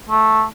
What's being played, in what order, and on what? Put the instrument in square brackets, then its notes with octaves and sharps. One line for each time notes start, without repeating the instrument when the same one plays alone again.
[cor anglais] A3